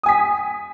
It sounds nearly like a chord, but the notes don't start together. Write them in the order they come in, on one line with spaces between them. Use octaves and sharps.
D#6 G#5 B6